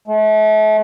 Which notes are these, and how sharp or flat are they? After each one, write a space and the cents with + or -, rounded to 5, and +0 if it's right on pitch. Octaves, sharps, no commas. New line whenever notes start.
A3 -40